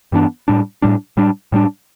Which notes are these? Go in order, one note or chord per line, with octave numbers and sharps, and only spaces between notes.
G2 E3 B3 D4
A2 G3 D4
A2 G3 D4
A2 G3 D4
A2 G3 D4